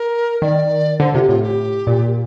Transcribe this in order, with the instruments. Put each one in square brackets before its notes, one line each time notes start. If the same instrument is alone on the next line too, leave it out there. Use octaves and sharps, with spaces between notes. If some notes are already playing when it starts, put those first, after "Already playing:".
Already playing: [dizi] A#4
[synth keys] D#3 [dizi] D5
[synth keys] D3 [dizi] C5
[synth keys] C3 [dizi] F4
[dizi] G4
[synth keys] A2 [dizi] F4
[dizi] G4
[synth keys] A#2